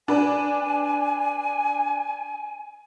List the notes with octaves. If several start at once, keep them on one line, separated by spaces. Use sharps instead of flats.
D4 B4 G#5